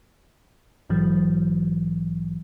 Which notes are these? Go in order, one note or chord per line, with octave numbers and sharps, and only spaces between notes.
A#1 G#2 E3 F#3